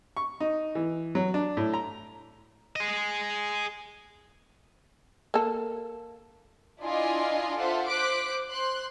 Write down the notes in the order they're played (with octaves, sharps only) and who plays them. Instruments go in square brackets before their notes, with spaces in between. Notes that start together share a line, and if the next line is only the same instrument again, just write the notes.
[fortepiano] C#6
D#4
E3
F#3
D4
A2
A#5
[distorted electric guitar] G#4 D#5
[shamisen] A#3 A4
[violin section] D4 E4 F4 D#5 G#5 C6
F4 A4 C5 E5 F#5
C5 D6 F#6 B6 D7
C5 C6 F#6